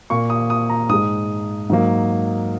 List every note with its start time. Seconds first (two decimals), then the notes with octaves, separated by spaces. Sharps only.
0.10 A#2 A#3 C#6
0.30 D#6
0.50 D#6
0.70 A#5
0.89 G#2 G#3 D#6
1.70 G#2 F#3 A#3